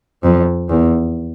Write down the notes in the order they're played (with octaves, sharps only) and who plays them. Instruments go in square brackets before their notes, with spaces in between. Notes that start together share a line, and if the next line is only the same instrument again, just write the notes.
[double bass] F2
E2